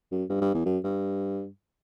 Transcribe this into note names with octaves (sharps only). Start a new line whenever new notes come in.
F#2
G2
G2
E2
F#2
G2